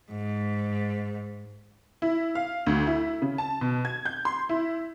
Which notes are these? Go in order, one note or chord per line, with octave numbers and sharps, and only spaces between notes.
G#2
E4
F5
D2
E4
C#3
A5
B2
G#6
G6
C6
E4